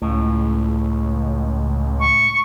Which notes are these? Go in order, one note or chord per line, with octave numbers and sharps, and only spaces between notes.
C#2 A2
C#6